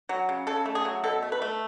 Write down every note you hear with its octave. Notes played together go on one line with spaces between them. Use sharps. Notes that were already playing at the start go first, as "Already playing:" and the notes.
F#3
C#3
C#3 A4
A3
G#4
F#3
B2 A4
A3
B4
A3